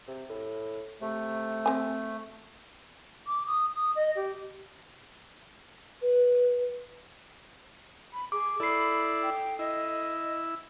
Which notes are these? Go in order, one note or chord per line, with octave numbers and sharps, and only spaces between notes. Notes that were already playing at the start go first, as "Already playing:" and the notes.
C3
A2
C3 A3
C4 G#5
D6
D#6
D#6
D#5
G4
B4
B5
G#4 D6
E4 A4 D5 B5 C7
G5
E4 D#5